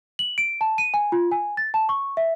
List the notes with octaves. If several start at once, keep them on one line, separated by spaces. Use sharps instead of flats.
F#7
D7
A5
D#7
G#5
F4
G#5
A6
A5
C#6
E5